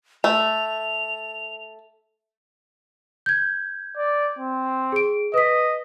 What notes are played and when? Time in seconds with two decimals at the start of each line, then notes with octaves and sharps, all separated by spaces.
0.24 A3 F7
3.26 G6 G#6
3.97 D5
4.39 C4
4.92 G#4 D7
5.34 B4 D#5 B6